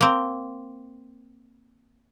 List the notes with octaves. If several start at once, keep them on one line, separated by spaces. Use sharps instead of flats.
A#3 C4